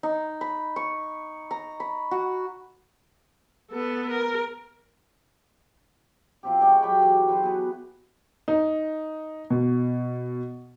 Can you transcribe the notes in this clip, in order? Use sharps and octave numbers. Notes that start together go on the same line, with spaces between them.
D#4
B5
C#6
A#5
B5
F#4
B3 A4
A#4
F3 C4 G4
G#3 G4 C#5 G5
F#3 G4 G5 B5
E3
F#3 F#4 B4 C5
B3 G#4 B4
D#4
B2